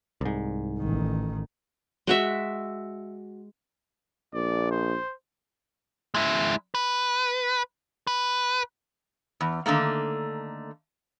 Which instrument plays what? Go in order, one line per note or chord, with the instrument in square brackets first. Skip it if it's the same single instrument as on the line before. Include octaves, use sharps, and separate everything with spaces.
[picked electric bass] C2 G#2
[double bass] A1 D#3
[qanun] G#3 F#4 E5
[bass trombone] A#1 [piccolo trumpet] D5
[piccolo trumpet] C5
[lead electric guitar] G#3 E4
B4
B4
[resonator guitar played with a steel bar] E2
D3 D#3 A3 A#3